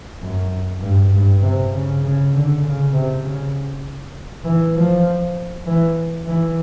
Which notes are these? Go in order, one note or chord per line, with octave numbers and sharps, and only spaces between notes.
F#2
G2
G2
C3
C#3
C#3
D3
C#3
C3
C#3
E3
F3
E3
E3